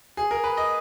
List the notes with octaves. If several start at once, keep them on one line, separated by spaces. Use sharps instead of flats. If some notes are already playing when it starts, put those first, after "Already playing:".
G#4
A#4
B4
D#5